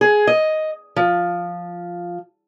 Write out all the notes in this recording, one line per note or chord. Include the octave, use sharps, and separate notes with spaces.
G#4
D#5
F3